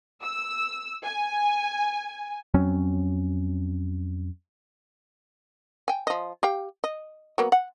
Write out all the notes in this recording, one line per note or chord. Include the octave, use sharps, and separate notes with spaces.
E6
G#5
F2 F#3 C4 C#4
G5 G#5
F3 D#5
G4 F5 G5
D#5
F#3 A#3 B3
F#5